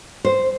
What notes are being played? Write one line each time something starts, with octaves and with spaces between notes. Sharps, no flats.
C5